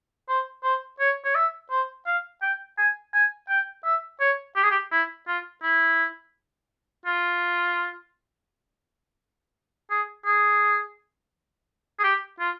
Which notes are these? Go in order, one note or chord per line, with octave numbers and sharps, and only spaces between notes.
C5
C5
C#5
C#5
E5
C5
F5
G5
G#5
G#5
G5
E5
C#5
G4
G#4
G4
E4
F4
E4
F4
G#4
G#4
G#4
G4
F4